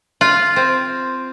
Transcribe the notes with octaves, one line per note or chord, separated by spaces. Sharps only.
F4
C4